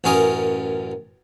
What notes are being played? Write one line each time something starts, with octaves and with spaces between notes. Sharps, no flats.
A1 F#2 C#4 A#4 D#6